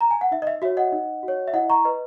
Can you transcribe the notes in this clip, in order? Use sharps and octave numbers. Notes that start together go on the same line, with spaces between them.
A#5
G#5
F#5
D#4 E5
D#5
E5
F#4 C#5 E5
D#5 F#5
D#4
F#4
C#5
E5
E4 D#5 F#5
A#5 C#6
B4 D#5